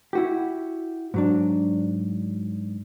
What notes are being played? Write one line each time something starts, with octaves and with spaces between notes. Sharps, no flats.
E4 F#4 G4
G#2 F#3 D4